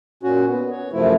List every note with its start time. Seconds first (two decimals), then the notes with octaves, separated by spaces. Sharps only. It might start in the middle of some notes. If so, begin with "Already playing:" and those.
0.23 A#2 C#4 F#4
0.48 B3
0.71 C#5
0.93 F#2 C3 F3 A3 E4